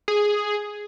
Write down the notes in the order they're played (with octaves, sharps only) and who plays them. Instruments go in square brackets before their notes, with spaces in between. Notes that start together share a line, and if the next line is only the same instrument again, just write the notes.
[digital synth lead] G#4